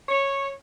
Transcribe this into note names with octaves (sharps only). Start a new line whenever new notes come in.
C#5